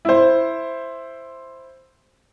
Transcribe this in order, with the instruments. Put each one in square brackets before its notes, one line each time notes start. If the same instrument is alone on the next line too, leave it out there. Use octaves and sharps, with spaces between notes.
[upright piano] E4 C5